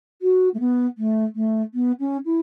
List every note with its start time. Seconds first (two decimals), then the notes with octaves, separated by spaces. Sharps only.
0.22 F#4
0.54 A3
0.60 B3
0.98 A3
1.35 A3
1.74 B3
1.99 C#4
2.25 E4